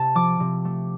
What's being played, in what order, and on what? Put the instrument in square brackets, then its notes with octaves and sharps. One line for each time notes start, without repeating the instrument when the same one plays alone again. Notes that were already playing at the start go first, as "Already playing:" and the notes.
Already playing: [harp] C3 A5
F3 D6
C3
A3